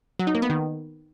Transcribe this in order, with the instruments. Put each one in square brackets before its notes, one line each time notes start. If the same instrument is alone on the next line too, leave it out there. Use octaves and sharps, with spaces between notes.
[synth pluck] F#3
D#4
A#3
B3
D#3